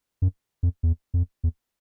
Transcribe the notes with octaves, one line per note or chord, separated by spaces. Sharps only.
F#2
F2
E2
F2
E2